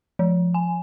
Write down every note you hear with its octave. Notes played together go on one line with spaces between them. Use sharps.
F3
G#5